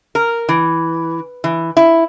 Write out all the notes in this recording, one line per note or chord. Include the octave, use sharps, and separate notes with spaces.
A#4
E3
E3
E4